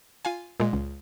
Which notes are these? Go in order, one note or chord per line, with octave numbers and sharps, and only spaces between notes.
F4 F5 G#5
A#2 G#3
C#2